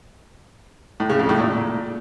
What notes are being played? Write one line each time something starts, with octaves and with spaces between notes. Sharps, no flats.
A2
C#3
F2
A2
A#2